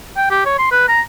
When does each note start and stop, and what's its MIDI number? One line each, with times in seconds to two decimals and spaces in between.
0.17 0.31 79
0.31 0.42 67
0.46 0.57 73
0.59 0.69 84
0.72 0.87 71
0.88 1.01 82